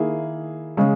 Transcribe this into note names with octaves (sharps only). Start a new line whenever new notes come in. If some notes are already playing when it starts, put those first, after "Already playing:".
Already playing: D#3 A#3 E4 G#4
C#3 G#3 C#4